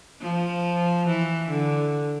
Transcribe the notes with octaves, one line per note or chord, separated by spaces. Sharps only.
F3
E3
D3